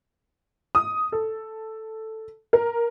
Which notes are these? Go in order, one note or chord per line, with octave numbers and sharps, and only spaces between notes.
D#6
A4
A#4